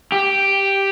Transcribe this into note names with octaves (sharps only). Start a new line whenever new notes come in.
G4